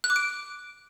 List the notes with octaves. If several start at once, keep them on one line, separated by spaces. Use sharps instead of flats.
F#6
D6
D7